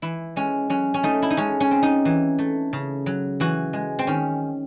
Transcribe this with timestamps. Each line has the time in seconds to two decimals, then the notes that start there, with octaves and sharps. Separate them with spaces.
0.02 E3 E4
0.36 G#3 C#4
0.70 F#3 C#4
0.94 C#4
1.03 A3 D#4
1.22 E4
1.30 D#4
1.37 G#3 C#4
1.60 C#4
1.71 C4
1.83 D#4
2.05 E3
2.39 A3
2.73 C#3
3.06 F#3
3.40 E3 F#4
3.73 G#3
3.99 C4
4.07 D#3 C#4